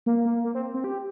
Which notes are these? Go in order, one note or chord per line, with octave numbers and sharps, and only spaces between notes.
A#3
A#3
A#3
C4
C4
G4